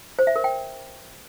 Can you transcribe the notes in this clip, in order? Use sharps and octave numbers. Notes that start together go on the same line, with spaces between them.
C5
E5
A#4
G5